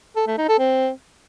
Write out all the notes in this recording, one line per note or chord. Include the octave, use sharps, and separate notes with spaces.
A4
A3
D#4
A4
C4